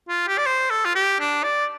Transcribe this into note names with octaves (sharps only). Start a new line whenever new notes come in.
F4
G4
D5
C5
A4
F4
G4
D4
D5